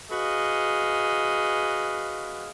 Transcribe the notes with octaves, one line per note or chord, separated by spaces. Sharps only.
F#4 G#4 B4 D#5 F5